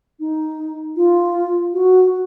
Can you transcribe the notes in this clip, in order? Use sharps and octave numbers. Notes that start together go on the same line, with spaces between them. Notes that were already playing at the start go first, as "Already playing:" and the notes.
D#4
F4
F#4